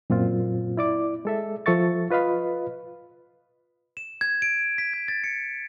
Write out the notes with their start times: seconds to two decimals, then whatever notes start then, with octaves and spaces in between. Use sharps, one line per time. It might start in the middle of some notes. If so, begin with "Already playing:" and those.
0.10 F#2 A#2 C4 F4
0.77 E4 D5 D6
1.25 G#3 A4 E5
1.66 F3 A4 E5 C#6 A6
2.10 F4 B4 D#5 F5 B5
3.97 E7
4.21 G#6
4.42 D7
4.78 B6
4.94 G#6
5.08 A6
5.24 C#7